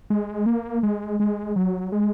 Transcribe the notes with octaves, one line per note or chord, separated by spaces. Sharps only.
G#3
A#3
G#3
G#3
F#3
G#3